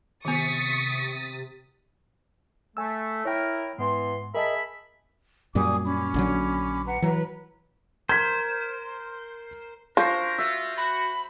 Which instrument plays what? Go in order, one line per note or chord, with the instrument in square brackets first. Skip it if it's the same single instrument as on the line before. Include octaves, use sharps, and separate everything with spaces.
[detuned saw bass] C3 [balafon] D#3 B3 [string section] C#6 [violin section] D#6 A6 B6
[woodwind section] A3 [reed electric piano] G#5 E6
[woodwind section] E4 A#4 [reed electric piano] C#5 G5
[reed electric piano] G#2 [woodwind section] E3 B3 C6
[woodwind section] G#4 E5 B5 [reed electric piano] A#4 D#5 A5
[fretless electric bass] F#2 A#2 G3 [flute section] G#5 D6 D#6
[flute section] C#4 B5 D6
[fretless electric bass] A#1 D3 F#3
[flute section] B4 F#5 A#5
[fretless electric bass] E3 F#3 [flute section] B4 A#5
[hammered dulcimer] A#4 [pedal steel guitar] C5 [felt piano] G#6 B6
[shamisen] F3 [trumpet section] D4 A#4 [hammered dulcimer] C5 C6 C#6
[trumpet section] F4 F#4 [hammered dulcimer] E5
[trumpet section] F#4 [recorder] B5